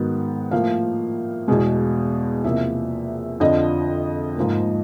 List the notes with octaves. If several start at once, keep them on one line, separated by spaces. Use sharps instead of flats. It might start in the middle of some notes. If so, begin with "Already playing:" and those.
Already playing: G#2 D#3 F#3 B3
A2 F3 A#3 F5
E2 B2 G#3
E2 C3 F3 A#3 E5
F2 D3 F3 D#5
G#2 F3 A#3